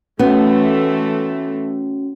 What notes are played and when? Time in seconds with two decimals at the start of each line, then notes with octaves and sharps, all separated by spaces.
0.19 E3 A3 B3 C#4 F#4